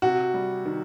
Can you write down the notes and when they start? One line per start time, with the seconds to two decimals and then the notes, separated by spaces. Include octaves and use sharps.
0.02 C3 F#4
0.34 G3
0.65 D#3